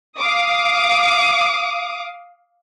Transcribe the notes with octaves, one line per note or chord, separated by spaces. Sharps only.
F5 D6 D#6